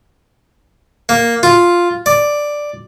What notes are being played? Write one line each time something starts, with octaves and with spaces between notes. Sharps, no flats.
A#3
F4
D5